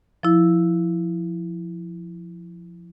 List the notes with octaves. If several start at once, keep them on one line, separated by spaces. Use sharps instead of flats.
F3 E4